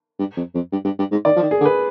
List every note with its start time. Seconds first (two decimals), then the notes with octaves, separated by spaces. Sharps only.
0.19 G2
0.37 F2
0.55 F2
0.72 G2
0.85 G2
0.99 G2
1.11 G#2
1.25 D#3 D5
1.36 F3
1.42 D#3
1.51 G#4
1.61 D3
1.65 B4